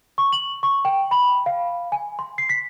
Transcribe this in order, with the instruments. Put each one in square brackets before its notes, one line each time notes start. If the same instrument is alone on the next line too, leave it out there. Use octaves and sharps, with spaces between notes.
[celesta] C#6
F#7
C#6
G5
B5
F5
G#5
C6
C7
B6